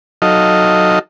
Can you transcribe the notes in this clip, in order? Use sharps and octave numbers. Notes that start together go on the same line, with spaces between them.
F#3 D#4 A4 D#5 F5